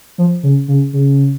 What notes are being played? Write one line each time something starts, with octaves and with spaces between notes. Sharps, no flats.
F3
C#3
C#3
C#3